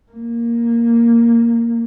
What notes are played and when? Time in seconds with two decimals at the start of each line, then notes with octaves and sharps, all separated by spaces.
0.12 A#3